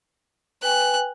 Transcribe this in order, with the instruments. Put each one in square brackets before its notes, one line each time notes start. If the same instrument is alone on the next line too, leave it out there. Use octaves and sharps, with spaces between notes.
[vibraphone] B4 G5 G#5 [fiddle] F#6